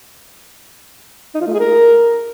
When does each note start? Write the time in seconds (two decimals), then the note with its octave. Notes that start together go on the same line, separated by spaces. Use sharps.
1.35 D#4
1.41 F4
1.47 A3
1.53 G#4
1.60 A#4